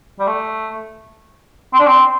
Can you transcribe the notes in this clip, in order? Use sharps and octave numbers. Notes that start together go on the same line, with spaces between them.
G3
A3
C4
D4
C4